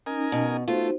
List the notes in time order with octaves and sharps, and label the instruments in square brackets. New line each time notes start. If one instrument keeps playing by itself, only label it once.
[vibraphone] C#4 D#4 [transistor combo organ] A#4 D#5 G#5
[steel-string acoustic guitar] B2
[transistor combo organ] A3 [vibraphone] D#4 F#4 C5 [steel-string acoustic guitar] F4